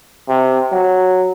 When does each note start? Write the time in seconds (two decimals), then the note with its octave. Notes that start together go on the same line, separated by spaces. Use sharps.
0.28 C3
0.72 F#3